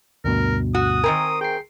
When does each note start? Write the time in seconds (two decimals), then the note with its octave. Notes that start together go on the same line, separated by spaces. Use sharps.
0.24 D2 G2 B2 A#4
0.75 F#4 D#6
1.04 D#3 C4 A#4 G#5
1.41 G#4 G5 C7